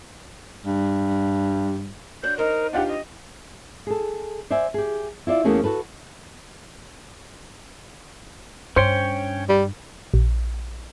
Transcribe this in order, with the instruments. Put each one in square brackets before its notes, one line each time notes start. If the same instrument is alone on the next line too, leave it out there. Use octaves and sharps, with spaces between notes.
[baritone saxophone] G2
[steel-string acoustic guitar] D4 F#4 C#5 [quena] G6
[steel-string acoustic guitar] D#4 C5 [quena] A#4
[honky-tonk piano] D4 F4 G4 [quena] F#5
[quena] D#5
[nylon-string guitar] G#4 A4
C5 D5 E5 G#5
G4 G#4
E4 F4 D5 E5
E2 A3 A#3 C#4 F#4 G#4
F#4 G4 A4 B4
[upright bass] G2 [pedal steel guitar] C#4 C#5 G5 [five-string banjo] C5
[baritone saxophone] G3
[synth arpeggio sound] A#1